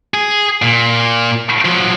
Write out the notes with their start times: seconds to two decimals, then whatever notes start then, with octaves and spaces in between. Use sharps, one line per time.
0.14 G#4
0.62 A#2
1.65 F3 F#3